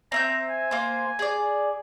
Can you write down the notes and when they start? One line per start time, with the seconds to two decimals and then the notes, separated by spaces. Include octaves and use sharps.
0.12 C4 E5 A#5 G6
0.50 G#5
0.71 A#3 C5
1.19 G#4 D5